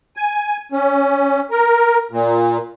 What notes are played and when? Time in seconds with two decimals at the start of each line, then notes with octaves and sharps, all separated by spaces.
0.17 G#5
0.72 C#4
1.51 A#4
2.11 A#2